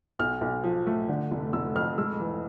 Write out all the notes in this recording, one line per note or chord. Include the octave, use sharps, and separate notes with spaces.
B1 F6
B1
F3
A3
D3
F1
F1 E6
F2 F6
G#3 E6
E3